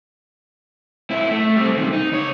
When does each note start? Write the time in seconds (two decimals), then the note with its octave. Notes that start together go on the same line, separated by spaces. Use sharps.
1.11 A#2 E4
1.31 A3
1.56 G3 C4
1.76 B1 D#3
1.93 D#4
2.12 C#2 C#5